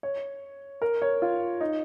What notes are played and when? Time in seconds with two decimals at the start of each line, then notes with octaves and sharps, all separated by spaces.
0.03 C#5
0.82 A#4
1.02 C#5
1.22 F4
1.61 D#4